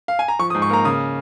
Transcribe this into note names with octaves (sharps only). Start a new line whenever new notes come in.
F5
G#5
A#5
F3 C#6
D#6
G#2
C#6
A#3 A#5
C#3 D#6